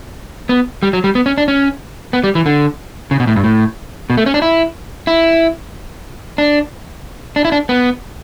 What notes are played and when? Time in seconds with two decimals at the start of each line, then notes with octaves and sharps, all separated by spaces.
0.49 B3
0.83 G3
0.93 F#3
1.04 G3
1.15 B3
1.26 C#4
1.38 D4
1.48 C#4
2.13 B3
2.24 G3
2.35 E3
2.46 D3
3.11 C#3
3.20 B2
3.27 A2
3.36 G2
3.44 A2
4.10 B2
4.17 A3
4.26 C#4
4.34 D4
4.42 E4
5.07 E4
6.38 D4
7.36 D4
7.45 E4
7.52 D4
7.69 B3